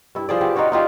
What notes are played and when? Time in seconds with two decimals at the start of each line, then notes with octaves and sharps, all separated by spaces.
0.15 G2 E4
0.29 F3 G#4 D5
0.41 B3 F4 G4
0.56 D#4 F4 F#4 C#5
0.72 D#4 F4 G4 D5